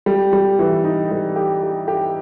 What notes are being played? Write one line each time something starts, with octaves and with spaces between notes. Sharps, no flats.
G3
G3
E3
D#4
G3
G4
G4
G4